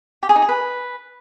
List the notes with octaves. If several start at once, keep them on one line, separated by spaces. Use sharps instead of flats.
G4
G#4
D#4
G#4
B4